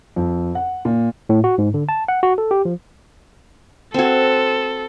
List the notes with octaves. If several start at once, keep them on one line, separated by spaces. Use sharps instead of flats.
F2
F#5
A#2
A2
F#4
G#2
D3
A5
F#5
F#4
A4
G4
F3
C4 F#4 A4